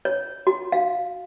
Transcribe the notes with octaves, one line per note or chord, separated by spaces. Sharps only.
C#5
F#4
F5